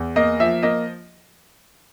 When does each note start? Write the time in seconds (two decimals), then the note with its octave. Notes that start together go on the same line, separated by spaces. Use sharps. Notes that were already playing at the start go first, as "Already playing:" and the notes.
Already playing: E2
0.16 A#3 D#5
0.40 F3 E5
0.63 A#3 D#5